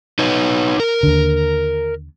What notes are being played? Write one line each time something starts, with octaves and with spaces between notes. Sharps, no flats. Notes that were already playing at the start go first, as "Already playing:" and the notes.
D#4 B4 C#5
A#4
D#2 D3